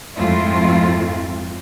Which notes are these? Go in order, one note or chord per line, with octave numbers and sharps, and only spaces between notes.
F2 G#2 A3 C4 E4 F4